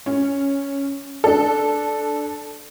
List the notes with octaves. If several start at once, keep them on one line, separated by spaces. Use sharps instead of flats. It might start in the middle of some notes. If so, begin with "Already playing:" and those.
C#4
D4 A4